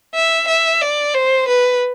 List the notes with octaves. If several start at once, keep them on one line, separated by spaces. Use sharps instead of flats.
E5
E5
D5
C5
B4